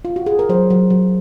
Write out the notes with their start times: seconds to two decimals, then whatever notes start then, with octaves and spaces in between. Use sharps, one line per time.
0.05 F4
0.16 F#4
0.26 G#4
0.39 A#4
0.49 F#3 C5
0.70 F#3
0.90 F#3